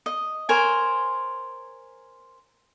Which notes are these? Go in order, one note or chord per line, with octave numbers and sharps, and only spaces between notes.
D#5
A#4 C5 C#5 G#5